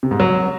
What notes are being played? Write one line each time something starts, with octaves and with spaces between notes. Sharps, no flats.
C3
G#2
F#3